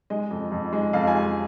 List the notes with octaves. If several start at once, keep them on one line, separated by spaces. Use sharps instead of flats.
G#3 D#5
F2
F2
G#3
F2 F5
G#5
G#3